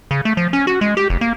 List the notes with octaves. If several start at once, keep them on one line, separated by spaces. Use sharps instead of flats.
C#3
A3
F3
C#4
F#4
G#3
G4
F1
A#3